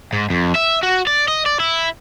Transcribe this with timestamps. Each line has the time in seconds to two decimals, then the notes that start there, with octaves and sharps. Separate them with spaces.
0.13 G#2
0.30 F2
0.55 E5
0.83 F#4
1.07 D5
1.28 D#5
1.46 D5
1.60 E4